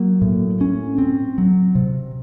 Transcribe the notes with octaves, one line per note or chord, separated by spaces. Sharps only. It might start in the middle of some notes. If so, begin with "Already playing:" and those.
Already playing: F#3 A#3
A2
C#4
C4
F#3
C3